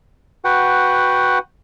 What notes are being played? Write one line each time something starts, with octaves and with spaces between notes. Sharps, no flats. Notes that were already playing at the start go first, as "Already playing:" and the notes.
F#4 B4 F#5 G5